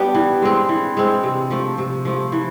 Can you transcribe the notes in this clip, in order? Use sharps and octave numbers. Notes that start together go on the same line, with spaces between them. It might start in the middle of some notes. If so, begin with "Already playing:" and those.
Already playing: G3 B3 D4 G4
E3
G#3 C4
E3
G#3 C4
C3
F3 A3
C3
F3 A3
E3